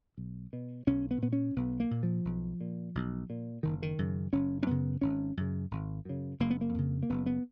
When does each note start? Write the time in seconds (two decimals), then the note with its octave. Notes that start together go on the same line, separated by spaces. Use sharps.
0.18 B1
0.53 B2
0.87 B1 C#4
1.11 B3
1.22 A#2 B3
1.33 C#4
1.56 B1 B3
1.80 A#3
1.91 A#2
2.03 F3
2.25 B1
2.61 A#2
2.95 B1
3.30 A#2
3.63 F#1 D#3
3.82 D#3
3.98 F#2 C#3
4.32 F#1 C#4
4.63 C#4
4.67 F#2 C#3 B3
5.01 G#1 C#4
5.37 F#2 C#3
5.71 G#1
6.05 F#2 C#3
6.40 F#1 A#3
6.50 B3
6.61 A#3
6.74 F2 C#3
7.03 A#3
7.10 F#1 B3
7.26 B3